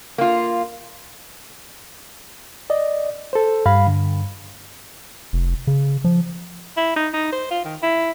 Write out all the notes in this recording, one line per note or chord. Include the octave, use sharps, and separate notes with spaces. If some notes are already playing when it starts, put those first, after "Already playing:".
A#3 F4
D5 D#5
A4 C5
G2 G3 F5 B5
D3
F1
C#3
F3
E4
D#4
D#4
C5
F4
D#3
E4